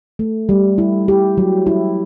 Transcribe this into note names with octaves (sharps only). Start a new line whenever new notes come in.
A3
G3
E4
G4
F#3
E4